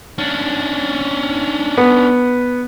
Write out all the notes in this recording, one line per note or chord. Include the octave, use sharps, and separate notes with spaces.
C#4 D4
B3